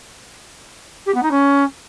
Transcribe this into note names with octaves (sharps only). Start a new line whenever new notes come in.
G4
B3
D#4
C#4